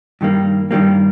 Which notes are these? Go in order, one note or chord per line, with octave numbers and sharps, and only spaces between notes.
G2 D#3 G3 A#3
G2 D#3 G3 A#3